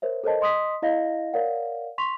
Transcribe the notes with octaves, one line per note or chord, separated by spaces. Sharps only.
A#4 C5 C#5 E5
A4 A#4 C5 C#5 D#5 A5
D#5 C6 D#6 B6
E4 D#5 F5 A#6
A#4 C#5 D5 F5 F#5
C6 C#6 B6 F7